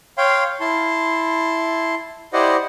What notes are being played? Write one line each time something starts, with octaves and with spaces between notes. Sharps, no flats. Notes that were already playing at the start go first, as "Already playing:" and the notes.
C#5 F5 G5 C6
E4 A5 C6
E4 G4 C5 D5 D#5 F#5